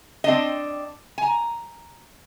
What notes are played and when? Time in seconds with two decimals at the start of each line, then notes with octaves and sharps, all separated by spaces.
0.24 C4 D4 D#5
1.18 G#5 A#5